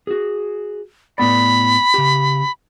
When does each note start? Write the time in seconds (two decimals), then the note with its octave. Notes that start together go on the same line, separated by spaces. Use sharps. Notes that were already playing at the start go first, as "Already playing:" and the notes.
0.07 F#4 G#4
1.18 A2 B3 D5 B5
1.94 C#3 G4